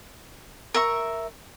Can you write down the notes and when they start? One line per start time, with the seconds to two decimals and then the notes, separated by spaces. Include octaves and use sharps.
0.74 A#4 E5 C#6